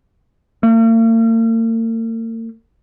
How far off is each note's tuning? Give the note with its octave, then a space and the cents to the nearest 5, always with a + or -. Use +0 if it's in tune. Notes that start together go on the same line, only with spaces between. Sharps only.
A#3 -45